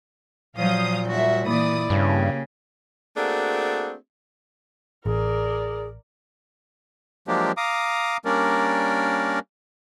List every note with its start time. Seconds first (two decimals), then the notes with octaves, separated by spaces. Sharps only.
0.56 A#2 F3 F#3 F5 D#6 G6
1.07 D#2 G3 F#4 E5
1.46 A#2 E3 E4 D5 D#6
1.90 G2 C#3 A#3 G4 G#4
3.17 A3 A#3 C4 D4 F#4 G#4
5.06 A1 G#4 A#4 D5
7.28 F3 F#3 G#3 A#3 D4 G4
7.57 F5 A#5 D6 D#6
8.25 G3 A#3 C#4 D4 A#4 D5